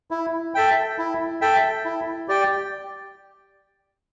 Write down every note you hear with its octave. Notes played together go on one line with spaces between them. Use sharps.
E4
A4 E5 G5
E4
A4 E5 G5
E4
G4 D5 G5